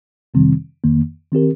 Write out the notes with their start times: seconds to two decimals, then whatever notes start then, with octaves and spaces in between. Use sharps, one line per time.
0.34 F2 C3 D#3 G3 C4
0.84 F2 D#3 A#3
1.32 D#3 C4 G4 A#4